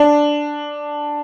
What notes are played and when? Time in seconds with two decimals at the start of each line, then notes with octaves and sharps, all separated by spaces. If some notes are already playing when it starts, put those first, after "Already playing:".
Already playing: D4